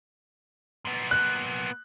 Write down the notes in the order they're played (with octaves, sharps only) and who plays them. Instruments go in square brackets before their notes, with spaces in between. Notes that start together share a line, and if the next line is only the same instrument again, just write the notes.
[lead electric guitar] A#2 B3
[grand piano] F#6